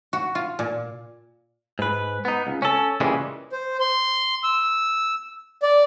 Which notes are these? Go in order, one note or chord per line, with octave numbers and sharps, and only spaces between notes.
F#4
F4
A#2
G#2 B4
B3 D#4
C#2
C#4 A4
A#2 C#3 E3 G3 G#3
C5
C6
E6
D5